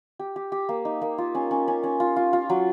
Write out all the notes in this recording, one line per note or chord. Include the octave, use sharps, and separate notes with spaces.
G4
G4
G4
A#3
D#4
A#3
F4
C#4
C#4
C#4
C#4
F4
F4
F4
F#3